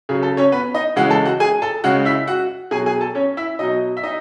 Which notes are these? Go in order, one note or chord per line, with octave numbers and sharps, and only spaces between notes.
C#3 F#3 G#4
A4
C#4 C#5
B3 B4
D#4 D#5
C#3 E3 G#3 F#4 F#5
A4 A5
F#4 F#5
G#4 G#5
A4 A5
C#3 G#3 F#4 F#5
E4 E5
F#4 F#5
B2 F#3 G#4 G#5
G#4 G#5
A4 A5
C#4 C#5
E4 E5
B2 F#3 D#4 D#5
E5
D#4 D#5